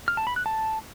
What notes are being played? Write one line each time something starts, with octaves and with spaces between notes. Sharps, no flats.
F6
A5
B5
F#6
A5